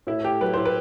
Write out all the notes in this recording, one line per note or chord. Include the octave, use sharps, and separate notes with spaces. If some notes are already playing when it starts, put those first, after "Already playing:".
A2 E4
A3 G4
F#3 B4
A2 C5
B4